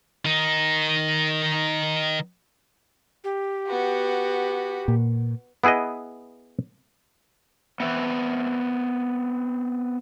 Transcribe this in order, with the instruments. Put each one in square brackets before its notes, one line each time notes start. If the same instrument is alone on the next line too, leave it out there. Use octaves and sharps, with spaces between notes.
[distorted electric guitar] D#3 D#4
[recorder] G4
[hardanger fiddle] B3 F#4
[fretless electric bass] A#2
[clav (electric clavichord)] B3 E4 G#4 B4 D#5
[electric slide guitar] B3 C4 E5